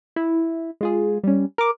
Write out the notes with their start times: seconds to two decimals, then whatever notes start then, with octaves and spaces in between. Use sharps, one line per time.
0.16 E4
0.81 G#3 F4 G#4
1.24 G3 C#4
1.58 A#4 D6